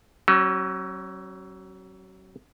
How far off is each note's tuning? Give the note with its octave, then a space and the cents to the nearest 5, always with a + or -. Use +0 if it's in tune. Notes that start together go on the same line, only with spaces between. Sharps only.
F#3 +30 C#4 -30